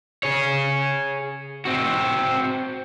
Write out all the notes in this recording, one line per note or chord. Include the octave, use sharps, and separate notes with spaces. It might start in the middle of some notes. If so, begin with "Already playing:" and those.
G#4 C#5
C4 F#4